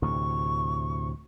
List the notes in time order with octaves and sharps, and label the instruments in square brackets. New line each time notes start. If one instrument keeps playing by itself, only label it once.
[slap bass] D2 A2 C3 [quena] C#6